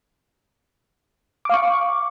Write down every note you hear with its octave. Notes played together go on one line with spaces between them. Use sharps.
F5 C#6 D6